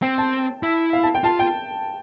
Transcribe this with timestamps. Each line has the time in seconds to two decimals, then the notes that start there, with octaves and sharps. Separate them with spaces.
0.02 C4 G5
0.18 A5
0.63 E4
0.93 F5
1.03 A5
1.14 G5
1.24 F4 A5
1.39 G5